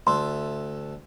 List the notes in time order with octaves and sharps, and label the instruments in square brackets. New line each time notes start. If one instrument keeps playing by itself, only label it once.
[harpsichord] D2 A3 [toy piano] C6